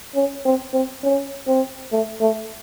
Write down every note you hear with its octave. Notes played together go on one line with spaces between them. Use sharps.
C#4
C4
C4
C#4
C4
A3
A3